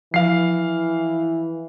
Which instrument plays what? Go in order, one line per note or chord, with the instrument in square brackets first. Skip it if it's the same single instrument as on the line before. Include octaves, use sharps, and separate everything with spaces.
[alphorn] E3 [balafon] F3 [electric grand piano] F5 C7